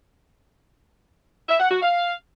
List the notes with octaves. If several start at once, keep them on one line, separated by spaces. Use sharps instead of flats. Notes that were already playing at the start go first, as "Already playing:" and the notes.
E5
F#5
F#4
F5